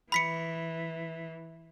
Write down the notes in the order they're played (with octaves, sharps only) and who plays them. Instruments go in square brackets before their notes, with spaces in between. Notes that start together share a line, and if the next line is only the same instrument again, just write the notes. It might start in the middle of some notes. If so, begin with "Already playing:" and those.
[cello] E3 [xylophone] B5 B6 C#7